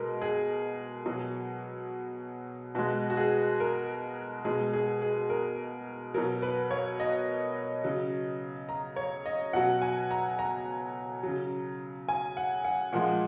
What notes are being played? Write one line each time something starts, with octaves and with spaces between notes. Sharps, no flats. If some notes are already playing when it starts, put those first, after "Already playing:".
Already playing: B2 G#3 A#4 D#5
G#4
B2 F#3
B2 G#3 F#4
F#4
G#4
A#4
B2 G#3 G#4
G#4
G#4
A#4
B2 F#3 A#4
B4
C#5
D#5
C#3 F#3
A#5
C#5
D#5
B2 F#3 F#5
G#5
A#5
A#5
C#3 F#3
G#5
F#5
F#5
A#2 F3 G#3 F#5